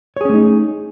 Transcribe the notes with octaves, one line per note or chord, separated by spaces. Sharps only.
A3 C#4 D#4 G#4 C#5